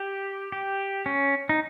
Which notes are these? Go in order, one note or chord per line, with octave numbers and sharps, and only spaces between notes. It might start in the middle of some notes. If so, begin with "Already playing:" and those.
Already playing: G4
G4
C#4
D#4